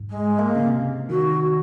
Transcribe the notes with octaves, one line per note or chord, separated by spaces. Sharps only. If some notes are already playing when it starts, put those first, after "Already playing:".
Already playing: G#2
G#3
A#3
C#3
C3
D#3 F#4